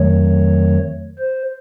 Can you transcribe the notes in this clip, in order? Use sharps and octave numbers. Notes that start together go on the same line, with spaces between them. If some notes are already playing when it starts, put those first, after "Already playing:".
Already playing: F2 D#3 F#3 A3 C#5
C5